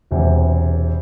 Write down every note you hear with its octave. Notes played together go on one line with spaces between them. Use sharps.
E1 E2 C3